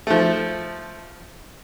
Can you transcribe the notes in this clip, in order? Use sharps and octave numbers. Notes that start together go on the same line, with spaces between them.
F3 A3